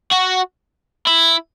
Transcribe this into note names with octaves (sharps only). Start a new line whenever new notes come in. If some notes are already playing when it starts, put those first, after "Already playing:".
F#4
E4